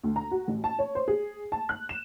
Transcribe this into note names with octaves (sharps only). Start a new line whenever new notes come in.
D2
A#5
F#4
A1
A5
C#5
C5
G#4
A5
F#6
E7